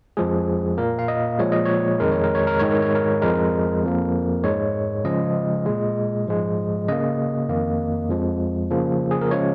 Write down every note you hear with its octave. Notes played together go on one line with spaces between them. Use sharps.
F2 F3 G#3 G#4
A#2 A#3 A#4
F5
D#5
A#2 F3 G#3 C#5
D#5
C#5
F2 D#3 G#3 A#4
C#5
A#4
C#5
A#4
G#2 D#3 G#3 C#5
A#4
C#5
A#4
F2 F3 G#3 A#4
F2 F3 A#3
G#2 G#3 C#5
C#3 F3 G#3 D#5
A#2 G#3
G#2 F3 G#3
C#3 A#3 D#5
F2 D#3 A#3
F2 F3 G#3
C#3 F3 A#3
G#4
A#4
C#3 F3 G#3 C#5